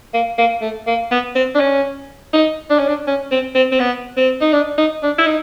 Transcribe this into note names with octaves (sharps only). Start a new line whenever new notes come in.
A#3
A#3
A3
A#3
B3
C4
D4
C#4
D#4
D4
C#4
D4
C#4
C4
C4
C4
B3
C4
D#4
D4
D#4
D4
E4
D#4